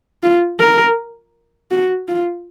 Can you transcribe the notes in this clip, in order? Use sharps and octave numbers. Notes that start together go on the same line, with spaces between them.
F4
A#4
F#4
F4